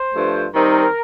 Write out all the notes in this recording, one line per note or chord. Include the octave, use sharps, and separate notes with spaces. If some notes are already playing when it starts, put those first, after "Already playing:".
Already playing: C5
G2 F3 A3
D#3 G3 C4 D#4 A#4